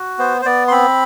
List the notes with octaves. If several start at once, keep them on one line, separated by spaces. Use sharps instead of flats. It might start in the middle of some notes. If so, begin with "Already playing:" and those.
Already playing: F#4
B3 C5
C5
B3 D5
C6
C4 B5